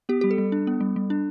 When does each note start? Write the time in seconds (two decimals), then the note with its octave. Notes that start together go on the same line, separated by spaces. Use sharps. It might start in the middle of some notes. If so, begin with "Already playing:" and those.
0.09 B3 G4
0.21 G3 G4
0.31 A4
0.38 G3
0.52 D4
0.67 B3
0.81 G3
0.96 G3
1.10 D4